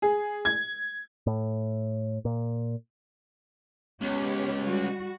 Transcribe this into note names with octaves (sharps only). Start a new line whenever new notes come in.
G#4
G#6
A2
A#2
C#2 B3 G4 C#5
G3 F#4